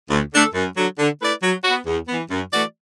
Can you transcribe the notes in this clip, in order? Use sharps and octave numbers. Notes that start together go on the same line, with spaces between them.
D2
D3 A3 D4 A4
F#2
D3 F#3
D3
A3 E4 B4 D5
F#3
B3 F#4
E2
E3 B3
F#2
E3 A3 F#4 D5